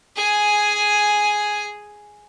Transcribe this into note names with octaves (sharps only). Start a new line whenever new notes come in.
G#4 G#5